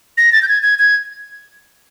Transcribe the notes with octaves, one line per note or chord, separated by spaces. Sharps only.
A#6
A6
G6
G#6
G#6
G#6